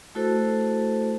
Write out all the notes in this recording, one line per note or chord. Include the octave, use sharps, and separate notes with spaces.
A3 E4 F#4 A4 C5